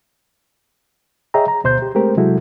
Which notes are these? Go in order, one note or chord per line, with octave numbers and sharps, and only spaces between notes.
G#4 C#5 D#5 E5 G5 A#5
A#5
D2 B2 C5 C6 G6
G4
G#3 A3 C4 G4 A#4 C5
C3 F#3 G#3 E4 F#4 A4